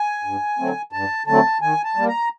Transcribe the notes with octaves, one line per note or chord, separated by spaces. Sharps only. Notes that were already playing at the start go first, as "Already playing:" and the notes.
Already playing: G#5
G2
D3 F#3 A3 C4
G2 A5
D3 F#3 A3 C4 A5
D#3 G#5
A5
G3 A#3
A#5